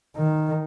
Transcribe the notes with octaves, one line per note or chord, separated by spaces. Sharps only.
D#3